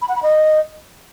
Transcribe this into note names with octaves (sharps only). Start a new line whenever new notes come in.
B5
F#5
B5
D#5